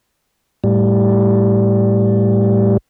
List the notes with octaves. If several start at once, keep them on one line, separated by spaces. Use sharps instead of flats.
A2 G3